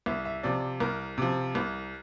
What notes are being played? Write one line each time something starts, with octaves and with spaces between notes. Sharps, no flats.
C2 E5
E5
C3 F3 D5
C2 A#4
C3 F3
C2